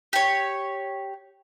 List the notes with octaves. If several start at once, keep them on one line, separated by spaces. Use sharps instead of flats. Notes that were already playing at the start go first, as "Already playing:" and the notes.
G4 C#5